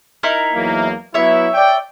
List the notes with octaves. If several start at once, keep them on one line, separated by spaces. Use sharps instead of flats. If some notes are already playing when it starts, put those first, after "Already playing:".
D#4 E4 A#4
E2 F#3 A#3
F#3 B3 E4 C#5 E5
D5 G5